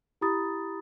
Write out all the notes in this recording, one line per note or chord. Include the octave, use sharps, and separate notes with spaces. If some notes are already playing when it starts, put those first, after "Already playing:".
E4 G4 A#5 B5 D#6 A6